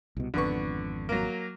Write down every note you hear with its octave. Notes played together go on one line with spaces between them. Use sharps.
C2 B2
G#1 F2 D3 B3 C#6
F#3 A#3